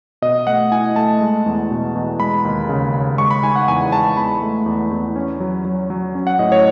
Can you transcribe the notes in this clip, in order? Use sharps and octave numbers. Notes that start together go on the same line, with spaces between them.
B2 D#5
A3 F#5
E4 G#5
A3 A5
G#3
E2
B2
E2
G#3 B5
D#2
C#3
C#3
G#3 C#6
B5
D#4 G#5
F#5
E2 G#5
G#3 A5
E2 B5
A3
E2
E2
C#4
F#3
F#3
F#3
C#4
F#5
A2 D#5
C#5